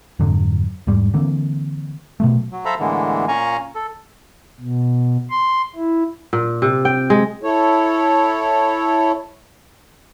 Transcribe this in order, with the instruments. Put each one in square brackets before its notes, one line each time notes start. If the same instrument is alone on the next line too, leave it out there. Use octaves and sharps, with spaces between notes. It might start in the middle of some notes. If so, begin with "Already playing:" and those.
[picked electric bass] F2 G#2 D3 F#3
E2 G#2 G3
D3 E3 A#3 C4
B2 F#3 A3
[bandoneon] F#3
A4 C5 E5 F5 A#5 B5
A2 D3 E3 G#3 A#3 B3
A#2 C#4 F5 G#5 A#5 C#6
A4
[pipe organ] B2
C6
E4
[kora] A#2
C3
G5
G#3
[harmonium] E4 A4 C#5